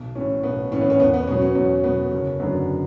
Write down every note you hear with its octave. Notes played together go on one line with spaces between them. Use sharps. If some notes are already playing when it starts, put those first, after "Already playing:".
Already playing: B1
A2 E3 C#4
B1 B3
A2 E3 C#4
B3
C#4
E2 B3
B3
B2 F#3 C#4
C#4
E2 C#4
B2 F#3 B3
F#1 C#4
F#2 D3 F#3 B3